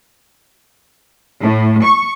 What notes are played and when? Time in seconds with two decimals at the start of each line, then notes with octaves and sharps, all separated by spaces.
1.40 A2
1.84 C#6